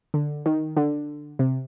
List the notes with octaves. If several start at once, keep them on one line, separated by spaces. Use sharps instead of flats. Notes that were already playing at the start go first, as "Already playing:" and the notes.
D3
D#3
D3
C3